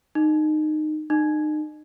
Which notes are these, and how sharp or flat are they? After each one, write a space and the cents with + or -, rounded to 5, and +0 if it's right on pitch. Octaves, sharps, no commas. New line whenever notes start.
D#4 -20
D#4 -35